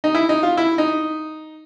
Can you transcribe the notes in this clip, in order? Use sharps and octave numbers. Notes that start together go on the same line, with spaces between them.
D#4
E4
D#4
F4
E4
D#4